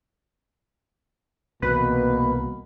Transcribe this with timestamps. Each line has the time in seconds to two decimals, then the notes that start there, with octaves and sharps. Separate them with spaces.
1.62 C2 B2 E3 A#3 C4 B4